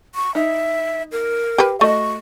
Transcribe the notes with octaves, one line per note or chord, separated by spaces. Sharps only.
C#6
D#4 E5
A#4
G4 B4
A3 F#4 D#5 C#6